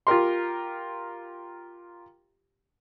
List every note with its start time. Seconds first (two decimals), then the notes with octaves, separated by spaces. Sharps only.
0.07 F4 G4 A#4 C6